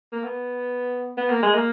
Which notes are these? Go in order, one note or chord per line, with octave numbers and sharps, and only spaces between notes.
A#3
B3
B3
A#3
G#3
A#3